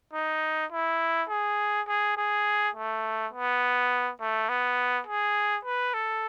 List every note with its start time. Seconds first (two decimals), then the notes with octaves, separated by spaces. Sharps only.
0.13 D#4
0.72 E4
1.29 G#4
1.88 G#4
2.17 G#4
2.75 A3
3.33 B3
4.20 A3
4.49 B3
5.07 G#4
5.65 B4
5.94 A4